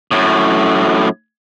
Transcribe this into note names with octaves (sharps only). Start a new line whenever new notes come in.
F#2 A2